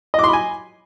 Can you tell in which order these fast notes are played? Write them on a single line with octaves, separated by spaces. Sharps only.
D#5 D6 C6 B5 G#5